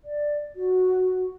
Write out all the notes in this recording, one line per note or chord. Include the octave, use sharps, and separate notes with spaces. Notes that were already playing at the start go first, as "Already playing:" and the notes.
D5
F#4